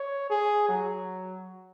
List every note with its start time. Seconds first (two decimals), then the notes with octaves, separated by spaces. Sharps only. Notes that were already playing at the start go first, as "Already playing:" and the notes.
Already playing: C#5
0.30 G#4
0.68 F#3